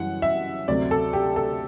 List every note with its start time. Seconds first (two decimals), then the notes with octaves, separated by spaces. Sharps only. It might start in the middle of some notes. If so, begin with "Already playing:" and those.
Already playing: F#2 E3 G3 F#5
0.22 E5
0.68 D2 C3 F#3 D5
0.91 A4
1.13 G4
1.36 A4